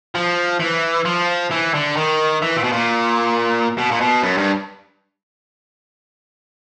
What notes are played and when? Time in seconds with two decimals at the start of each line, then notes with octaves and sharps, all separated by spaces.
0.15 F3
0.60 E3
1.05 F3
1.51 E3
1.74 D3
1.96 D#3
2.42 E3
2.57 A#2
2.64 B2
2.72 A#2
3.78 B2
3.91 A#2
4.00 B2
4.22 F#2
4.37 G2